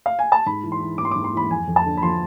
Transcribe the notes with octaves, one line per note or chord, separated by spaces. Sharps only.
F5
G#5
A5
G#2 B5
E3
C6
E3
G#2 D6
C6
G#2 D6
C6
E3 B5
F2 G#5
F2
A5
D3
B5
F3 C6